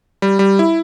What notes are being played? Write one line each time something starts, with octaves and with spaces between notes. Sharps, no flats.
G3
G3
E4